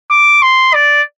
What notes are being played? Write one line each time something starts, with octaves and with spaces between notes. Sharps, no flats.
D6
C6
D5